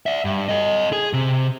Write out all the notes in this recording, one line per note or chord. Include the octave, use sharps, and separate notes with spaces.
D5 E5
G2
A4 D#5
G#4
C3